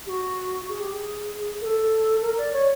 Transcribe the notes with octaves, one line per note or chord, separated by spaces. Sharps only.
G4
F#4
G#4
G4
G#4
A#4
A4
A#4
D5
C#5